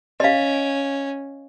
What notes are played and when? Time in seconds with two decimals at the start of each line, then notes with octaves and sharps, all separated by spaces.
0.20 C#4 D#5 F5